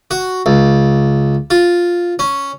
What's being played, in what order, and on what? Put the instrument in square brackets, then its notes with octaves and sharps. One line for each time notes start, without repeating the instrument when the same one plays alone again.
[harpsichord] F#4
C#2
F4
C#4